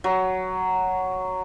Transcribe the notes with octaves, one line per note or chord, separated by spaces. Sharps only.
F#3